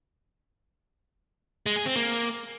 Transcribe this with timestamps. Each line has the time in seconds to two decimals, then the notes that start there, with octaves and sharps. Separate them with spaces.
1.66 G#3
1.76 G#4
1.86 C4
1.96 A#3